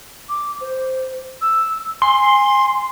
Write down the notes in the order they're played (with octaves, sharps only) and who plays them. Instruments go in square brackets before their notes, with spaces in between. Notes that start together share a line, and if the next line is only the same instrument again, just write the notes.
[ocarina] D6
C5
E6
[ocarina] G#5 [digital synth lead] C6